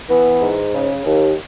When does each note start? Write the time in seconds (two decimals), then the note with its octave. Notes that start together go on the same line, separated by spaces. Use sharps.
0.09 E3 B3
0.41 G#2
0.73 C#3
1.05 D#2